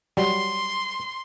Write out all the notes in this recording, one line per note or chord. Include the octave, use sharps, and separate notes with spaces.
F#3 G3 C6